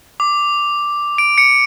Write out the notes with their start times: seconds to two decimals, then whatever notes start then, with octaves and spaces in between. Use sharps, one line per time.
0.20 D6
1.18 D7
1.38 C#7